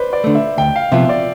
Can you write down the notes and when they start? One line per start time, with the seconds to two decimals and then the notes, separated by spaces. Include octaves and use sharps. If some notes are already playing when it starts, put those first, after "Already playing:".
Already playing: B4 C5 D5
0.13 D5
0.24 D3 A3
0.35 E5
0.58 D2 G5
0.76 F5
0.92 C3 F3 B3 F4 E5
1.09 D5